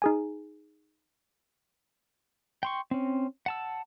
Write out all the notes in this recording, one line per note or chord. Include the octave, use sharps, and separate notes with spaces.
D#4 G#4 G#5
G5 C6 C#6
C4 C#4
F#5 A5 E6